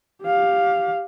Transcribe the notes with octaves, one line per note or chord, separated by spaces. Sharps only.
G4 F5